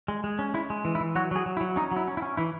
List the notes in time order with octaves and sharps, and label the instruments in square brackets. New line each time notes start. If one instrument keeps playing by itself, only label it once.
[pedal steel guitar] G#3
G#3
C#4
G#3 E4
G#3
E3
E4
E3
F#3 F#4
F#3 G#4
F#3
E4
F#3
C#4 D#4
F#3
E4
C#4
E4
C#4
E3 E4